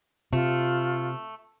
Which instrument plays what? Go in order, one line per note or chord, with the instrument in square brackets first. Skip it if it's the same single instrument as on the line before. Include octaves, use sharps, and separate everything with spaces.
[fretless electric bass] C3 [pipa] A3 [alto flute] F4